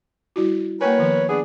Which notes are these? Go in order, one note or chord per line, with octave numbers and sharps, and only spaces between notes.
G3 E4 F#4
A#3 A#4 B4 C#5 G5 G#5
D#3 F3 B3
B3 D4 G#4